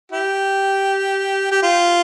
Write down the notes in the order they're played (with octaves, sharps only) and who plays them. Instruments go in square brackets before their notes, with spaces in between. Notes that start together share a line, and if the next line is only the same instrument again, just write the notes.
[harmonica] E4 G4
G4
F4